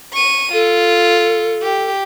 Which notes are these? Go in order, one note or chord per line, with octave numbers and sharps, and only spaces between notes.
C#6 D#7
F4 A4
G4